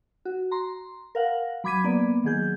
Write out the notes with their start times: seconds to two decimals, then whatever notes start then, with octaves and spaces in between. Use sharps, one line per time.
0.25 F#4
0.51 A#5 C6
1.15 A#4 F5 F#5
1.64 F#3 B5 D6 G#6 B6 D#7
1.84 A#3 B3 D5
2.24 D#3 F#3 G#4 G6